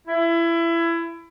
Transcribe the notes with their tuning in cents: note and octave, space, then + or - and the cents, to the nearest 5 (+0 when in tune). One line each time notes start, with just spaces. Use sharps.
E4 +25